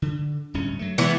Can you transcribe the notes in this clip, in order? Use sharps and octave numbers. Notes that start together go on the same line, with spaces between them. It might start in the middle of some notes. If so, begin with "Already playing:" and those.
D3
D1 G2 C#4
F#3 A3
E3 G#3 B3